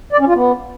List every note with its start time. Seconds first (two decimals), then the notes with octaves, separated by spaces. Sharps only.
0.13 D5
0.20 C#4
0.28 F4
0.35 B3